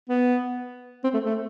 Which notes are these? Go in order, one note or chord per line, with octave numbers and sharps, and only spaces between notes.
B3
C4
A3
A3